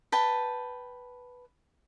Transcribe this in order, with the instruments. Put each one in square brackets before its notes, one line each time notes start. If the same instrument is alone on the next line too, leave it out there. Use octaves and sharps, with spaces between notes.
[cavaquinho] B4 G5 A5